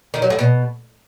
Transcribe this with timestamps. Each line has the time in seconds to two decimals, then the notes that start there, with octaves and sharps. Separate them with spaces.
0.14 D#3
0.22 F#3
0.30 A2
0.39 B2